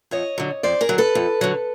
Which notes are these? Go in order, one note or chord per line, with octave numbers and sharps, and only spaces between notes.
F2 C#5 D#5
D3 F#3
F2 C5 D5
G#4 A#4
D3 F#3
A4 B4
F2
D3 F#3